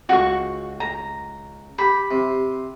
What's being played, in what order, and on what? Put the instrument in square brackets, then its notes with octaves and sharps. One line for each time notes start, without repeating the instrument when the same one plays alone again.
[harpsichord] C#2 [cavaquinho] F#4 C#6
[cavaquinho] A#5
[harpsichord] G4 [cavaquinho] B5
[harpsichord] C3